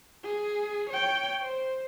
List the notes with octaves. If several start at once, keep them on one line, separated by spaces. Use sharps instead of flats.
G#4
C#5 G5
C5